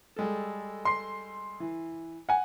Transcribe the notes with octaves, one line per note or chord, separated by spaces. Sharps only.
G3 G#3 A4
C6 C7
E3
F#5 G#5